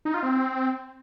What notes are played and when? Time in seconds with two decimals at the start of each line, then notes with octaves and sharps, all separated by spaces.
0.05 D#4
0.14 F4
0.23 C4